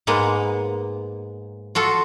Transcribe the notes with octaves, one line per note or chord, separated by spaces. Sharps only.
G#2 G#3 A#3 B3
F4 F#4 A4